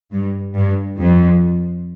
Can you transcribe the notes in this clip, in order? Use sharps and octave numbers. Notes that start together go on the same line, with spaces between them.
G2
G2
F2